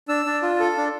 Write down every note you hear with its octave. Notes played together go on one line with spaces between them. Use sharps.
D4 E6
D4
F4
A4
D4